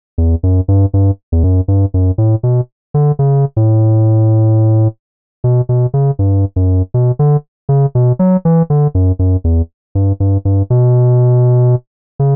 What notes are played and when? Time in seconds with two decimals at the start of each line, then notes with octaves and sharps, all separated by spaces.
0.18 E2
0.43 F#2
0.68 G2
0.94 G2
1.32 E2
1.43 F#2
1.68 G2
1.94 F#2
2.18 A2
2.43 B2
2.94 D3
3.19 C#3
3.57 A2
5.44 B2
5.69 B2
5.94 C#3
6.19 G2
6.56 F#2
6.94 B2
7.19 D3
7.69 C#3
7.95 B2
8.19 F#3
8.45 E3
8.70 D3
8.95 F#2
9.19 F#2
9.44 E2
9.95 G2
10.20 G2
10.45 G2
10.70 B2
12.19 C#3